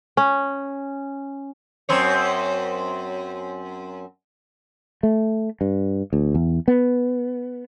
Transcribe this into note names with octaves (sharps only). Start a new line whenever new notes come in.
C#4
F#2 C4 C#5
A3
G2
D2
E2
B3